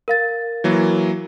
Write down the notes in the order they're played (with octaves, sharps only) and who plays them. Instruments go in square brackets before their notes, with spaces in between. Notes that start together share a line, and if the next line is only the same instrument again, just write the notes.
[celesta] A#4 F5 A6
[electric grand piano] E3 F#3 A#3